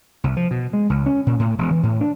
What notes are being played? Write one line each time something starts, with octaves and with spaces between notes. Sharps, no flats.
C2
F3
B2
G#3
C#2
C#4
A#2
A2
E1
E3
A2
D4